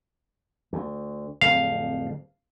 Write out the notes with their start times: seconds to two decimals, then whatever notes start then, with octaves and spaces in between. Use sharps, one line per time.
0.73 D2
1.41 D1 F2 F5